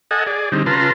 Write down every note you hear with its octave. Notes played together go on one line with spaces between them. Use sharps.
A4 D#5 F#5 G#5
G#4 D5
D3 G3 C4 D#4
C#3 F4 B4 A5 A#5 C6